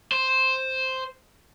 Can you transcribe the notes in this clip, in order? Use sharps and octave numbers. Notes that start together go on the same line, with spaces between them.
C5